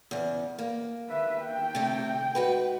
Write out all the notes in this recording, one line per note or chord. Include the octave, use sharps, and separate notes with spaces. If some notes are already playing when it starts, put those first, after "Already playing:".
E2 C#3
A#3
B4 E5
G5
C3 A3
G#2 F#4 B4